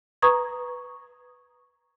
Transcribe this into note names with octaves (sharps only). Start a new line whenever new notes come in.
B4 A#5 C#6 D#6 G#6